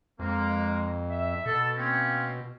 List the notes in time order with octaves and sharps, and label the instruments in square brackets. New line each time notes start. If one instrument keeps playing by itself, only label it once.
[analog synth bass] F2 [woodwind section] G#3 A#3
[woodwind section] E5
[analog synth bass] B2 [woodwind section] A4
[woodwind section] A#3 C4 C#4